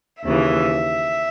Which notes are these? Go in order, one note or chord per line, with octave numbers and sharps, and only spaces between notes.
D#2 C#3 E3 E5